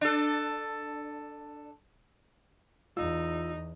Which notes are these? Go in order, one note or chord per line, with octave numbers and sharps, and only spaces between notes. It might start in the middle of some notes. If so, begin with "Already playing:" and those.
D4 A4
E2 D#4 F4 E6